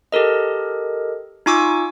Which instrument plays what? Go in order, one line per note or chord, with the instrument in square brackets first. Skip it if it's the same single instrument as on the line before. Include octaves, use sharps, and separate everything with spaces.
[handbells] G4 A4 A#4 D#5
D#4 F4 G#5 C#6 D6 E6